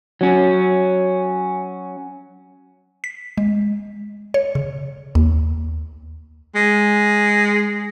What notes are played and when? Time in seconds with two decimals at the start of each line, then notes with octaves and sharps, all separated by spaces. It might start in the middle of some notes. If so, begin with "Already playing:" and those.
0.21 F#3 C#4
3.04 B6
3.38 G#3
4.34 C#5
4.55 C#3
5.15 D#2
6.56 G#3